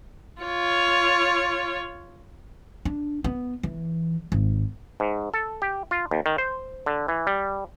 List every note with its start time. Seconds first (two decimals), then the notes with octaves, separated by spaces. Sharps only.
0.42 F4 C#5
2.85 D4
3.24 B3
3.63 E3
4.32 G#1
5.00 G#2
5.34 A4
5.62 G4
5.91 F4
6.11 D#2
6.26 D#3
6.38 C5
6.86 D3
7.08 E3
7.27 G3